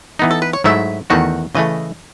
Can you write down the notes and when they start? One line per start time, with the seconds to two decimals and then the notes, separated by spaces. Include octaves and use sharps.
0.19 E3 B3 D#4
0.31 A4
0.42 B4
0.53 C#5
0.64 G#2 F#3 A3 E4 E5
1.10 E2 D#3 A3 D#4 F#4 F#5
1.55 C#3 E3 A3 D#5